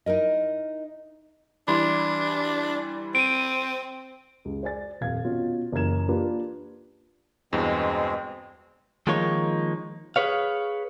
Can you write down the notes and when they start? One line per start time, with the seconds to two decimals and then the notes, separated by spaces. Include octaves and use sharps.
0.06 D#4 E4 A#4 D#5
1.68 E3 G3 D4 E4 B5 C6
3.15 C4 D7 D#7
4.45 C#2
4.63 C5 D5 G#5 A6
5.01 D#1 F2 F5 G#6
5.24 B2 C#4 F4
5.72 F#1 E3 C#4 A#4 G#6 E7
6.09 A#3 D4 F4 G4 B4
7.53 E2 G2 B2 G#3 C4
9.07 D#3 F3 G#3 A#3 D#4 C#5
10.16 G#4 B4 C#5 F5